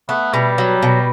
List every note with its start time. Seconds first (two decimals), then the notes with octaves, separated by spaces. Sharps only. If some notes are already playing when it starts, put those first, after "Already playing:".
0.09 A3 B3
0.34 B2 G3
0.58 F#3
0.82 B2